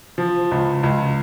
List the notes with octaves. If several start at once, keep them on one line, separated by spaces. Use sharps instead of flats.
F3
C#2
C#2